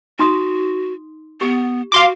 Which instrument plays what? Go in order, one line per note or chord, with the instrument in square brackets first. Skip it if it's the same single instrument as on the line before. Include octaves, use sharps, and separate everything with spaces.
[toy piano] D#4 C6 D#6 [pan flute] F#4
[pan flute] B3 [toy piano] G4
[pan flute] F#4 [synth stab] F5 C6 D6